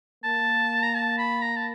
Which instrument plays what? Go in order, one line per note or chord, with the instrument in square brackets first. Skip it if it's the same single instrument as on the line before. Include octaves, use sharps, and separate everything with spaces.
[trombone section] A#3 [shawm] A5
[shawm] A#5
A5
B5
A#5
A5